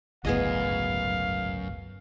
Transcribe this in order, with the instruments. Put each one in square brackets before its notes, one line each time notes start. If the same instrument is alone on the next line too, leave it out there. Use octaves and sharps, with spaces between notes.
[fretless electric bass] G1 C#2 A2 [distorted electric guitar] F#2 [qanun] B3 G#4 D#5 [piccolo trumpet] F5